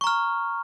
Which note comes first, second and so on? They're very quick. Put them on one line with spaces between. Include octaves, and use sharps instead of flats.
C#6 A#5 F6